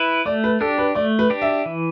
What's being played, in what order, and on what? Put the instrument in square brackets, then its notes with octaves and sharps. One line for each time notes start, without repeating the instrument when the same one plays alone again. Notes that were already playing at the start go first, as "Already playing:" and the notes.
Already playing: [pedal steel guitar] E4 B4
[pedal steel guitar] A3 [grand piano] D5
[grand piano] B4
[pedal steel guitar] D4 G4 [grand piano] A4
[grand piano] B4
[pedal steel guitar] A3 [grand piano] D5
[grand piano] B4
[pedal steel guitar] D4 G4
[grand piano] E5
[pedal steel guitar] E3